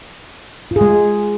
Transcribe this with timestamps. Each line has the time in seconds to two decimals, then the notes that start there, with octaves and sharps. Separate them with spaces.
0.71 F4
0.76 G#4
0.81 G#3